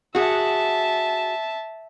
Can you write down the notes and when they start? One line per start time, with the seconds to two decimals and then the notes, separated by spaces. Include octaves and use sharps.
0.15 F#4 G#4 E5 A5